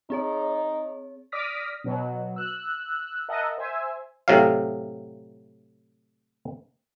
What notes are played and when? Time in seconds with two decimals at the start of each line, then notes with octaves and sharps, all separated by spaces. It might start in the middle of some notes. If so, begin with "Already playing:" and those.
0.10 C4 D#4 G#4 C#5
1.32 D5 D6 D#6 F6 A#6 B6
1.84 B2 F#3 B3
2.36 E6 F#6
3.28 A#4 D#5 E5 F#5 A5
3.58 C5 E5 G#5
4.28 A2 C3 F#3 F5